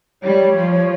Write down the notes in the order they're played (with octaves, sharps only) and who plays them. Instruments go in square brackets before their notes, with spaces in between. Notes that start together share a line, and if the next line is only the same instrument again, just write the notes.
[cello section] G3 [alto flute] C#5
[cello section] F3